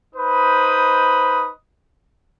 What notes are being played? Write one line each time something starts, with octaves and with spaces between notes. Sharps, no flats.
D#4 B4 C5 B5 D#6